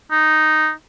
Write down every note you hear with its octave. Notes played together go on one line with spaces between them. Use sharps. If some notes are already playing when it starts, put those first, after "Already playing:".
D#4